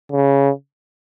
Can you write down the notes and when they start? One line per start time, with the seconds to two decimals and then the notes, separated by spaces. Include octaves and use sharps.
0.12 C#3